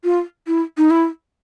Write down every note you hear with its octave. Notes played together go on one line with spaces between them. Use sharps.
F4
E4
D#4
E4